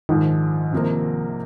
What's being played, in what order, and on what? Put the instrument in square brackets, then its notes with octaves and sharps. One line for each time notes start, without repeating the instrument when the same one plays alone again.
[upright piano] A#1 G#2 F3 [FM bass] D#3
[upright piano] C2 C3 F3 A#3